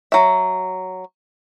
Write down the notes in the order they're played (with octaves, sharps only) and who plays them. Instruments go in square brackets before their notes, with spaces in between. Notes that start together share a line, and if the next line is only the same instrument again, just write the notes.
[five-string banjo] F#3 E5